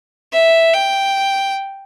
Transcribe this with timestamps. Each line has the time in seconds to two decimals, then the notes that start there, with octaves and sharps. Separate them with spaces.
0.33 E5
0.74 G5